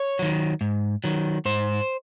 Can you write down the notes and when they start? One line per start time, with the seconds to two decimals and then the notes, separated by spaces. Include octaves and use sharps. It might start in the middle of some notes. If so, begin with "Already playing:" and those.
Already playing: C#5
0.19 D#3 F#3
0.61 G#2
1.04 D#3 F#3
1.45 G#2 C5